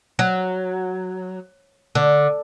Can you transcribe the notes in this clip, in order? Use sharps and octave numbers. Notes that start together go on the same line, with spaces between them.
F#3
D3